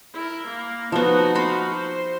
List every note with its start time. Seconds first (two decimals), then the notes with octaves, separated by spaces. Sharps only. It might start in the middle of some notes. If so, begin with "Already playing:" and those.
0.14 E4 A#4
0.47 A#3
0.92 F3 B3 D#4 F#4
1.35 F5 B5 C6
1.74 C5